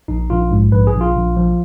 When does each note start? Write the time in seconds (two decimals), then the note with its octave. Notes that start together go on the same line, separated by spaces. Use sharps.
0.08 A#1 D#4
0.30 A#1 F4
0.51 G#2
0.72 A#1 B4
0.87 G#4
0.94 A#1
1.01 F4
1.15 A#1
1.36 F3